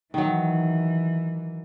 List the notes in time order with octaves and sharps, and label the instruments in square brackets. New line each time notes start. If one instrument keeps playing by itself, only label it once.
[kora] D#3 F#3 [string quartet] E3